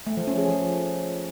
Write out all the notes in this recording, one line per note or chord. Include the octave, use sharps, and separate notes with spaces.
A3
F3
C#4
G#4
F3